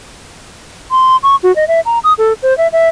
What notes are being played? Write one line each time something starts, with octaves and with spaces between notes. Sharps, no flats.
C6
C#6
F#4
D#5
E5
A#5
D#6
A4
C5
E5
E5